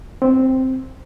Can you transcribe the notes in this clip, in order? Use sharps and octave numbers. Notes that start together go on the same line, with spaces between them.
C4